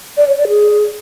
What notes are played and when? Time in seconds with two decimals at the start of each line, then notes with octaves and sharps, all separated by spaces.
0.17 D5
0.27 C#5
0.38 D5
0.48 G#4